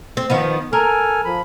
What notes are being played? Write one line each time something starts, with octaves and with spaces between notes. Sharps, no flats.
C4
D#3 F3 B3
A4 A#4 G#5 F6
F3 B5